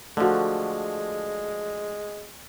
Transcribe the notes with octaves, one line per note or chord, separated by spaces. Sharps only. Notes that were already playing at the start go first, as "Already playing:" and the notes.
D3 F3 G#3 A3 F#4